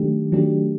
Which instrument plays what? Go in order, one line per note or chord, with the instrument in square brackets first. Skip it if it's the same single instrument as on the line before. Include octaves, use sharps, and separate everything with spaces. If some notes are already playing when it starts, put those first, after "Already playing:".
Already playing: [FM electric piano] D#3 F#3 A3 D4 G4
D#3 F#3 A3 D4 G4